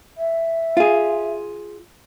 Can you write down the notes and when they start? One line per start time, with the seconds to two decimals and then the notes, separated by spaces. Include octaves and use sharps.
0.17 E5
0.77 F4 G#4